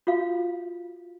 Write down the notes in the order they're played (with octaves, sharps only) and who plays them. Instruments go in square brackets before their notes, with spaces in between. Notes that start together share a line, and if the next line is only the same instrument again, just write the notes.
[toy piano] F4 F#4 F5